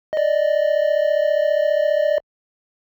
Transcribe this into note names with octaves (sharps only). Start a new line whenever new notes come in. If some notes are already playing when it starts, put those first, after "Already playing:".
D5 D#5